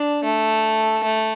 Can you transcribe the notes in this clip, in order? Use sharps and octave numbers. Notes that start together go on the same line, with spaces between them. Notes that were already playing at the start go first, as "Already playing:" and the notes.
Already playing: D4
A3
A3